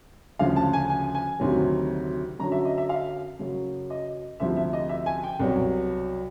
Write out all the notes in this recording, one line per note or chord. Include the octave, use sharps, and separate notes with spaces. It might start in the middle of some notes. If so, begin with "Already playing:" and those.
D2 C#3 F3 F5
A5
G#5
G#5
G#5
D2 C3 D#3 F#3
F#2 D3 F#3 A#5
E5
D#5
E5
F5
F#2 C#3 F#3
D#5
D2 C3 F3 E5
E5
D#5
E5
G#5
G5
C2 B2 F#3